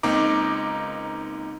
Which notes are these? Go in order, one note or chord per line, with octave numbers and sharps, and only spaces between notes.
C#2 A#3 C4 D#4 A#5 D6